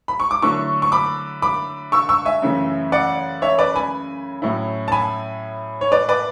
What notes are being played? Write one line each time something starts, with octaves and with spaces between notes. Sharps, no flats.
B5
C#6
D6
D3 F#3 A3 E4 C#6 E6
C#6
B5 D6
B5 D6
C#6 E6
C#6 E6
E5 G#5
F#2 C#3 E3 A3
D5 F#5
C#5 E5
B4 D5
G#5 B5
A2 F#3 C#4 E4
A5
G#5 B5
C#5
B4 D5
B4 D5